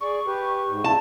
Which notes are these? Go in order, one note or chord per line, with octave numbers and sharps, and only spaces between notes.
G#4 D5 C#6
G4 B4
G#2
D#2 C#3 E4 A5